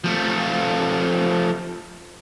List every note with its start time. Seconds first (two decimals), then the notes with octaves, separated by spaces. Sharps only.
0.04 F3 A3